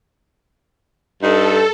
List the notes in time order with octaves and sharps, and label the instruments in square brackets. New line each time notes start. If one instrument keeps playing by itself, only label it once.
[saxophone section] G2 D#4 [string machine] A4